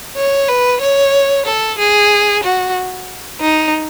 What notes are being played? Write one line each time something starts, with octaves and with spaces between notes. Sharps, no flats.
C#5
B4
C#5
A4
G#4
F#4
D#4